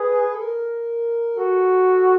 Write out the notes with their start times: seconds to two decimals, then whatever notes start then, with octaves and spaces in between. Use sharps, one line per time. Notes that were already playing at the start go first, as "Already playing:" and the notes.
Already playing: G#4 B4
0.35 A4
0.42 A#4
1.37 F#4 A4